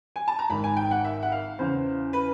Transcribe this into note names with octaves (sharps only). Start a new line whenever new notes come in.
G#5
A5
A#5
G#1 G#2 D#3 B5
G#5
G5
F#5
E5
F#5
F5
E2 C#3 E3 C5
B4